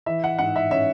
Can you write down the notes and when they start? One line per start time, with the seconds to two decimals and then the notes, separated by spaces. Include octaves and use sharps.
0.06 E3 E5
0.24 F#5
0.39 G#2 F#5
0.56 E5
0.71 C#4 E5